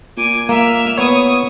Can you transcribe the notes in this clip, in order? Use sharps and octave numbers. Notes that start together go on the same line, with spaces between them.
A#2 G#5 D6
A#3 E5 F6
B3 C#5 C#6 D#6